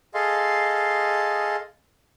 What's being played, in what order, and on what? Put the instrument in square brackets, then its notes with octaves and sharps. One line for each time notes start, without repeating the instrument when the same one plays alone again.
[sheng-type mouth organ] G#4 A4 D#5 F5 C6